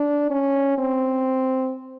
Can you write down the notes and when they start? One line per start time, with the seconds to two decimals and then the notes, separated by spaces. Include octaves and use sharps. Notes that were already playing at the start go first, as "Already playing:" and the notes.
Already playing: D4
0.31 C#4
0.78 C4